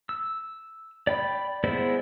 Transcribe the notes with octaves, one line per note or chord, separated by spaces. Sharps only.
E6
D5 G5 B5
G#3 B3 E4 C5 D5